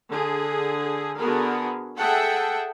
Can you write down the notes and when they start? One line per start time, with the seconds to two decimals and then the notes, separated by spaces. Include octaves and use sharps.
0.12 D3 G#4
1.18 D3 B3 F#4 G#4 A#4
1.97 G#4 A4 E5 F#5 G5 A5